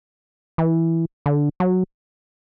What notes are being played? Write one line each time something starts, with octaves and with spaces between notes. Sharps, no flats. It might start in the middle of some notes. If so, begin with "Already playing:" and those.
E3
D3
F#3